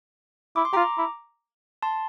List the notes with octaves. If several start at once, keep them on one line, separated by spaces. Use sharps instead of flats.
E4 D6
C6
F4 G4 A#5 D6
E4
A5 C6